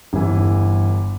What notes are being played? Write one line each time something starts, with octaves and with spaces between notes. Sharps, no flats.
G1 E3